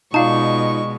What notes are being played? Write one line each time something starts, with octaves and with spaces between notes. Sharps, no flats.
B2 G#3 D#4 F4 D5 F5 A5 C#6